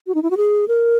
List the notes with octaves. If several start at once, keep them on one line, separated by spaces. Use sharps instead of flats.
F#4
D#4
E4
F#4
G#4
A#4